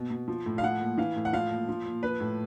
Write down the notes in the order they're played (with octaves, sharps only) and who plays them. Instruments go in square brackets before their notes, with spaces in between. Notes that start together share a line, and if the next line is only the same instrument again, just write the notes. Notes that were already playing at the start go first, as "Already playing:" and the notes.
Already playing: [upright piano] B2
B2
F3
A2
F5
F3 F#5
A#2
E3 F5
A2
F#5
F3 F5
A#2
F3
A#2
F3 B4
A2